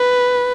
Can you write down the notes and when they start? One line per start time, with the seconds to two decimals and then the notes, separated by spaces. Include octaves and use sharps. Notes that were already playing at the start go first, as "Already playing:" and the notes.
Already playing: B4